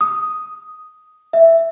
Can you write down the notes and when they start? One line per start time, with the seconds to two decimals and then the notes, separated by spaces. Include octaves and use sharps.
0.01 D#6
1.33 E5